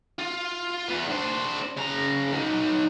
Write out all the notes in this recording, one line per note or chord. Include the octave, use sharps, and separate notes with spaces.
F4
E2 B3
D4 C5
C#3 A#5
F#3 D#4